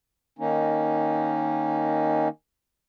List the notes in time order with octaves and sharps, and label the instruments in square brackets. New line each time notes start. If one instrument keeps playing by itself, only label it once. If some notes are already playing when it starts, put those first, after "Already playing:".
[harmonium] D#3 A#3 C#4 D#4